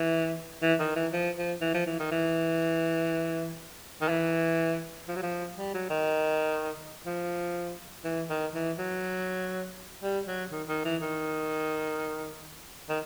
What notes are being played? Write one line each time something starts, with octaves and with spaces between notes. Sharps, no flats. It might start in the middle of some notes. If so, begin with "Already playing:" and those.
Already playing: E3
E3
D#3
E3
F3
F3
E3
F3
E3
D#3
E3
D#3
E3
F3
F#3
F3
G3
F#3
D#3
F3
E3
D#3
E3
F#3
G3
F#3
D#3
D#3
E3
D#3
D#3